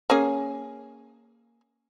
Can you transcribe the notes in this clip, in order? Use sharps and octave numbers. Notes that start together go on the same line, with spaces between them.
A#3 C#4 G#4